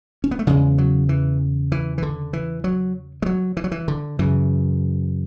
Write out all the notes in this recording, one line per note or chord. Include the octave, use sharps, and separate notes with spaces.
C#4
B3
A3
E2 C#3 G#3
F#3
E3
E3
E3
D3
E3
F#3
G#3
F#3
E3
F#3
E3
D3
F#2 C#3 E3